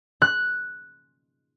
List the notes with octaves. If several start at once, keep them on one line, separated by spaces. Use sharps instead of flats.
F#6